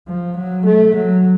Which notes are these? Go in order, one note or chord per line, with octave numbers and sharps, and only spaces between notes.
F3
F#3
A3
F#3